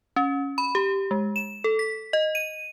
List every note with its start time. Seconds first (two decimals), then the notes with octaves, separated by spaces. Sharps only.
0.16 C#4
0.58 B5
0.75 G4
1.11 G#3
1.36 E7
1.64 A4
1.79 B6
2.13 D#5
2.35 D#7